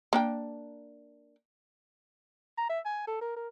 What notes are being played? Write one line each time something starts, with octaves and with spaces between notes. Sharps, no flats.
A#3 D4 G5
A#5
E5
G#5
A4
A#4
A#4